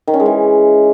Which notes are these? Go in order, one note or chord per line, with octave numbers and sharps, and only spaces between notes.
D#3
C#4
G#3
E3